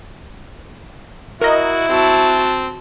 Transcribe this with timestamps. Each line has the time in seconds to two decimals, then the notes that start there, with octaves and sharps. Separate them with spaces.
1.41 E4 F#4 A#4 D#5
1.89 C4 F#4 A5